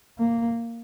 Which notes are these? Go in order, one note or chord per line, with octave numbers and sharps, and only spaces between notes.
A#3